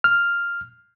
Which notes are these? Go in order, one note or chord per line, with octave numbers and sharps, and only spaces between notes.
F6